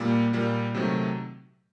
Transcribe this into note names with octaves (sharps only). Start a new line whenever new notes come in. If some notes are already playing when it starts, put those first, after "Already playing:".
Already playing: A#2 G3 A#3
A#2 G3 A#3
C3 D#3 F#3 A3